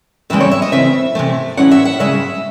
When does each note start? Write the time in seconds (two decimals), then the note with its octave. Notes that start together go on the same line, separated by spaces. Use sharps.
0.30 E2 C#3 E3 G#3 C4 E5
0.40 C#5
0.52 E5
0.62 D#5
0.72 C#3 E3 A3 C4 E5
1.15 C3 E3 A3
1.57 A2 E3 G#3 C#4 E4 F#5
1.71 E5
1.85 F#5
1.99 C#3 G#3 C#4 E5